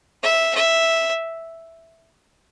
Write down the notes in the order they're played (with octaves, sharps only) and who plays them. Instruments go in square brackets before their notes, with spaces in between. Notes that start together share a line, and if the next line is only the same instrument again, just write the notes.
[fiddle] E5
E5